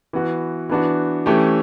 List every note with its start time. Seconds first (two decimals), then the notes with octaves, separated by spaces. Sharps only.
0.13 E3 B3 F#4
0.69 E3 B3 D4 F#4
1.26 E3 A3 C#4 G4